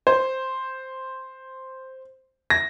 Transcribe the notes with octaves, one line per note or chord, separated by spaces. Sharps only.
C5
A#6